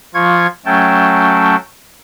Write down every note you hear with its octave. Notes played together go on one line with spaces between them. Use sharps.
F3 F4 C#6 G#6
F#3 A3 C#4 G5 A5